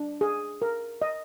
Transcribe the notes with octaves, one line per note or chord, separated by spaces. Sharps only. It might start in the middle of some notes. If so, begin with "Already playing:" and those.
Already playing: D4
G#4
A#4
D#5